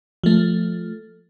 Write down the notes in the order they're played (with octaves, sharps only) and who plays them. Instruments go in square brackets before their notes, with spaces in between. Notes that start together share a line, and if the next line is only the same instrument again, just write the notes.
[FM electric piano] F3 A3